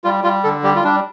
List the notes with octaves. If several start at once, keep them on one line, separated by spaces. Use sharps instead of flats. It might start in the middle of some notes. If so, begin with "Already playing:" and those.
G3 F4
G3 F4
D3 A4
G3 G4
F4
G3 D4